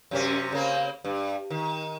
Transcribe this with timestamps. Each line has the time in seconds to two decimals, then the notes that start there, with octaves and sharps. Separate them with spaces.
0.11 F#2 C3 C#4
0.53 C#3 A#3 C4
1.05 G2
1.50 D#3